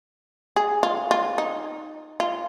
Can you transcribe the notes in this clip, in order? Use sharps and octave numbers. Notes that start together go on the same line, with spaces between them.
G#4
F4
F4
D#4
F4